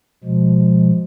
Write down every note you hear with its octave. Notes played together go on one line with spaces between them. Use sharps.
B2 F3 G#3